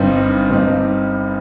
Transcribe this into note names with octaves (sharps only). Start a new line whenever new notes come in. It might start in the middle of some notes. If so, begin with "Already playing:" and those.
Already playing: G1 G2 G3 C4 D#4
G1 G2 G3 C4 D#4